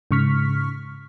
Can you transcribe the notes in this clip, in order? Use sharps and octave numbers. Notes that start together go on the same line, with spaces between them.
G#2 C#3 C#6 F6 B6